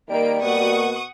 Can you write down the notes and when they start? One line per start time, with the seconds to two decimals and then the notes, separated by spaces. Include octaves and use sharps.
0.10 D#3 G3 A#3 D7
0.41 B2 A#3 F#4 A#4 F#5 C#6 D#6